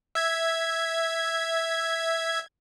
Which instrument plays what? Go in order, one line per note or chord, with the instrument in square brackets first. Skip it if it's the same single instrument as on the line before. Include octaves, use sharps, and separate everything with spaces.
[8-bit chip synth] E5 G#6